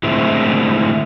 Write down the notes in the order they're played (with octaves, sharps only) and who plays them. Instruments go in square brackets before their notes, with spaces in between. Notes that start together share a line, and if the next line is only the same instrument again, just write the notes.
[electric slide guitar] A2 D3 G#3 C4 E4